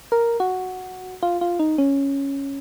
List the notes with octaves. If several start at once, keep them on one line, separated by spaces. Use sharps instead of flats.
A#4
F#4
F4
F4
D#4
C#4